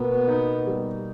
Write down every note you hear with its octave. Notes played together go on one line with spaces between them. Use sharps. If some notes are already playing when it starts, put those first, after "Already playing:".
Already playing: B2 A#3 B3
D#4
G3